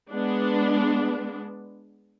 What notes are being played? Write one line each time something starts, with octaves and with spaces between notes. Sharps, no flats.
G#3 B3 D4